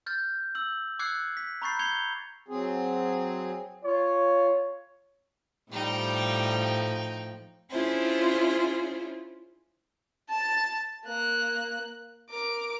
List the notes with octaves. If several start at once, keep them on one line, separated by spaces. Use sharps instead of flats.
F6 G6 A6
E6 F#7
D6 E6 F#6 G#6 C7 C#7
B6
A#5 B5 C#6 G6 A6 C7
G6 G#6 C7 C#7 F7 G7
F#3 C4 G#4
F4 C#5
A2 F3 G3 D#4 G5
C#4 D4 E4 F4 G#4 C5
A5 A6
A#3 F#6
A#4 D6